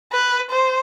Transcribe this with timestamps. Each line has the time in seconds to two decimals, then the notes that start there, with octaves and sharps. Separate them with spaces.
0.13 B4
0.52 C5